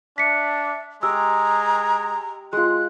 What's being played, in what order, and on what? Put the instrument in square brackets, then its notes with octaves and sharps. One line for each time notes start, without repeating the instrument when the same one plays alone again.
[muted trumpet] D4 [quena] E5 [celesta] B6 C#7
[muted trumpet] G#3 [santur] G4 D6 [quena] A#5 [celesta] E6
[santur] G#3 F4 [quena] F#6